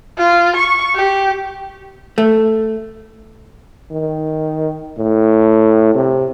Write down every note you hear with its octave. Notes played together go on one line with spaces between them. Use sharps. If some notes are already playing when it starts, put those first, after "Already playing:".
F4
C#6
G4
A3
D#3
A2
C3